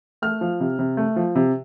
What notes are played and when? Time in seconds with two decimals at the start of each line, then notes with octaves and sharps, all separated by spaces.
0.22 A3 F6
0.41 F3
0.60 C3
0.79 C3
0.97 A3
1.16 F3
1.35 C3